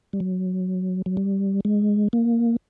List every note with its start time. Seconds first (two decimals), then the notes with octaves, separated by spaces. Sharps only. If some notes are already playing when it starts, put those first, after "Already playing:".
0.13 G3
0.20 F#3
1.06 F#3
1.17 G3
1.65 G#3
2.13 A#3